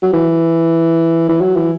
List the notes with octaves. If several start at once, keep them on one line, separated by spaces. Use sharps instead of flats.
F#3
E3
E3
F#3
E3